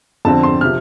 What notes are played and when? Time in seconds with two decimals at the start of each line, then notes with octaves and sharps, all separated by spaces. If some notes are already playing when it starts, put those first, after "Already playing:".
0.25 F2 D3 F3 C4 A5
0.43 C6
0.61 C3 F3 F6